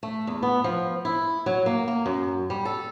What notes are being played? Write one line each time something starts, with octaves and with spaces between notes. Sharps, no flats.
A3
E2
B3
F3
E4
F#3
A#3
A#3
F#2
G3
A4